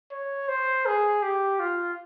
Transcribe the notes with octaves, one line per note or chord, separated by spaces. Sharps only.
C#5
C5
G#4
G4
F4